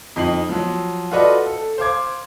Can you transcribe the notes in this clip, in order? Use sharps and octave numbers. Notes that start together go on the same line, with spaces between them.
F2 D#4 C7 F#7
F3 F#3
F4 F#4 A4 B4 D5 D#5
A4
C5 F5 D6 G#6